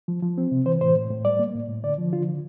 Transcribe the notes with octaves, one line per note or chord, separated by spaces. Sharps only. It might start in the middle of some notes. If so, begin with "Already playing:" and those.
F3
F3
C4
C3
E3 C5
A2 C5
A2
A2
G3 D5
A#3
A2
A2
D3 D5
F3
D3 F4
D3